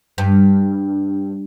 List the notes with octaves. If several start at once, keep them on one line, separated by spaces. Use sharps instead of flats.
G2